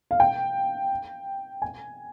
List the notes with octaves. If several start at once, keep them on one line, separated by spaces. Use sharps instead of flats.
F5
G5
G#5